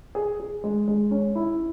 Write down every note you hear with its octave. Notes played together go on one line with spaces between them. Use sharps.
G#4
G#4
G#3
G#3
C#4
E4